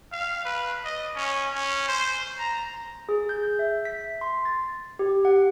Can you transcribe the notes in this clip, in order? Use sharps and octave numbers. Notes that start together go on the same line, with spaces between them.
F5
B4
D#5
C#4
C#4
C5
A#5
G#4
G6
E5
B6
C6
A6
G4
F#5